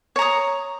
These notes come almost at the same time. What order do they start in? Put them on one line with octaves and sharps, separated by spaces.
C#5 A#5 D#6